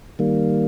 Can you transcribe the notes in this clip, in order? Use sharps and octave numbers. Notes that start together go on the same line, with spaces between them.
D#3 G3 A#3